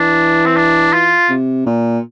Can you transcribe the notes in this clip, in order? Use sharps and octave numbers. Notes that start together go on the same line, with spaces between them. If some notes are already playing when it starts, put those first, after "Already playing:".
Already playing: E3 D4
C4
D4
F4
C3
A#2